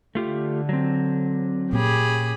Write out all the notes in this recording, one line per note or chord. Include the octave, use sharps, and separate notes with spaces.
D3 A3 F4 G4
F#3 C4
A#2 C#4 G4 G#4 B5